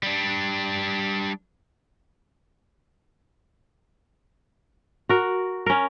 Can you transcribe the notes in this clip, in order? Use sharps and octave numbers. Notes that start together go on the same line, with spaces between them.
G3 D4
F#4 A#4
C#4 A#4